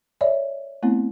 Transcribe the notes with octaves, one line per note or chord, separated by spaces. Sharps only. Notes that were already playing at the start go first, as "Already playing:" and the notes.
C#5 D5 E5
A3 B3 C4 E4